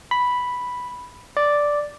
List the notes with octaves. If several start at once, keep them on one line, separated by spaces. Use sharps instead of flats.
B5
D5